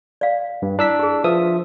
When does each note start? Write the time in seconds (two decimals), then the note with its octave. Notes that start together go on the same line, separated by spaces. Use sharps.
0.21 D5 F5
0.62 G2
0.79 D4 E4 E6 B6
0.99 G4 G#4
1.24 F3 B4 E5 D#6 E6